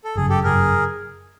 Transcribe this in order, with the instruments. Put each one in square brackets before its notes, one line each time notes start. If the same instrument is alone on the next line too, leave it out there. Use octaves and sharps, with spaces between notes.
[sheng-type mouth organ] A4
[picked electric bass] G1 F#2 C#3 [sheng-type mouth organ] G#4
[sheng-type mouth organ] G4 A4
[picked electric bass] G1 F#2 C#3 [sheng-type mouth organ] G#4 A#4